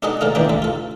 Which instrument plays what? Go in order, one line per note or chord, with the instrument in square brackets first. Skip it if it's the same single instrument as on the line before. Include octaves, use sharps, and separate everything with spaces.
[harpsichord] D4 D#4 G#4 A4 D#5 F#5
A#2 C#3 A3 A4 F5 A#5
A#1 A#2 C#3 E3 D4 G5
D2 A4
F4 A4